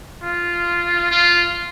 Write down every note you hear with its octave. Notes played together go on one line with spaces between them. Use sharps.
F4
F4